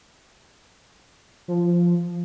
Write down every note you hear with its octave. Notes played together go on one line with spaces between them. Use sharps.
F3